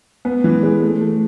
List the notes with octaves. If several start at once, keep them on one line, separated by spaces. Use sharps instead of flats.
B3
E3
G#3
A3
A3